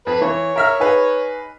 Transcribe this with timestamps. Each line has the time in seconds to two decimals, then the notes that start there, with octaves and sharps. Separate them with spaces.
0.07 F2 B4
0.21 E3 C#5
0.56 A#4 E5 F6
0.80 D#4 G#4 B4